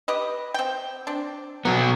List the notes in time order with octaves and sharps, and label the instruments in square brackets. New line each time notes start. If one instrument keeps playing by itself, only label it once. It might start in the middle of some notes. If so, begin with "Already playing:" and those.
[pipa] G4 B4 D#5
C4 G5
C4 D4
[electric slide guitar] B2 F#3 B3 [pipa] A#5